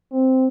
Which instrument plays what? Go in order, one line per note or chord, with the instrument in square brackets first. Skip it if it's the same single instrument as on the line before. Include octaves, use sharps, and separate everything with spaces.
[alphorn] C4